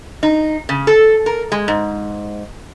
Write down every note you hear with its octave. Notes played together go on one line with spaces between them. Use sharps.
D#4
C#3
A4
A#4
G#3
G#2